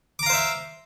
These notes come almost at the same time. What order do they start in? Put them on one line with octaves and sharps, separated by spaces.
D6 A#5 F5 C5 E5